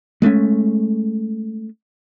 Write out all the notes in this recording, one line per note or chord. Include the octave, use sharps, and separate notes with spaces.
G#3 A3 C4 C#4